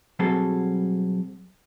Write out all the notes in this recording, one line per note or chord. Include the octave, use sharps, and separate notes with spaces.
B1 F#3 G3 C4 G#4 A4